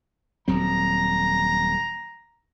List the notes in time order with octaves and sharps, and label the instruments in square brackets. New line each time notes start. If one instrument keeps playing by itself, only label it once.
[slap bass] D#1 F#3 C4 [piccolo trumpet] A#5